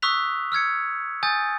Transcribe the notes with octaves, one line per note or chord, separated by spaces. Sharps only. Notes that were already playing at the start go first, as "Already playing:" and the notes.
C#6 D#6 E6 F#6 B6 F7
E6 F6 G#6 C#7
G#5 D#6 G6 A6